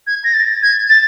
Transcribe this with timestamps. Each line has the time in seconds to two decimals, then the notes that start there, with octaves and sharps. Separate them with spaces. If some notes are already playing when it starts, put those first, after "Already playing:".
0.07 G#6
0.24 A#6
0.33 A6
0.62 G#6
0.89 A6